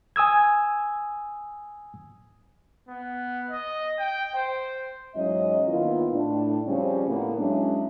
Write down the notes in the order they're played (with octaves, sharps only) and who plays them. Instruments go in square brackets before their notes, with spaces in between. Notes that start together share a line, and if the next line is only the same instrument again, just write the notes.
[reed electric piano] G#5 D#6 E6 G#6
[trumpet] B3
D#5
G5
C5
[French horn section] G#2 E3 F#3 C#4 D#5
D#3 A#3 B3 E4 F4
A2 D4
C#3 F3 G3 C4 C#4
A2 A#3 B3
F#3 G#3 C#4 D4 E4 G#4